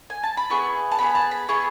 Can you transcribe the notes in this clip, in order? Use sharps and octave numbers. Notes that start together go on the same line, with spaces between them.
G#5
A5
B5
B3 E4 G#4 C#6
A5
B3 E4 G#4 B5
A5
B5
B3 E4 G#4 C#6